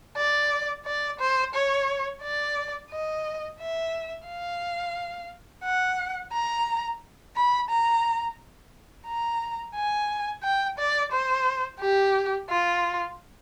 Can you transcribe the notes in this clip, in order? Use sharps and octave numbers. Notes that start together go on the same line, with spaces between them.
D5
D5
C5
C#5
D5
D#5
E5
F5
F#5
A#5
B5
A#5
A#5
G#5
G5
D5
C5
G4
F4